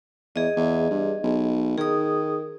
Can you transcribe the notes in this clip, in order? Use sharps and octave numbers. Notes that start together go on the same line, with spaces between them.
E2 G#4 D#5
E2
G2
B1
D#3 G#4 D#6